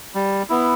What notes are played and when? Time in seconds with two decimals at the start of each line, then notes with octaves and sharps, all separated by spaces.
0.15 G3
0.50 B3 E4